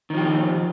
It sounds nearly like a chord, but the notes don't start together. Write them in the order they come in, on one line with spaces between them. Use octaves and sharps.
D#3 F3 G4